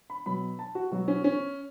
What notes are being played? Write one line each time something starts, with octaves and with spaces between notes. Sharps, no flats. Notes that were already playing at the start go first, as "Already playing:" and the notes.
B5
B2 F#3 B5
A5
F#4
B2 F#3 F#4
C#4
C#4